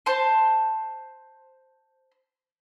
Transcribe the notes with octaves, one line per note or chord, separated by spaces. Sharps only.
C5 A5 C6